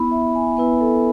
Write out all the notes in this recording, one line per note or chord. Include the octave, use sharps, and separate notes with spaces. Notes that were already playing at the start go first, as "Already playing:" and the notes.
Already playing: B3 E4 B5
E5
G#5
B3 E4 B4
A4